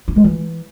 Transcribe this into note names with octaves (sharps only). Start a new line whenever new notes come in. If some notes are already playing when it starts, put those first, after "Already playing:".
D4
G#3
E3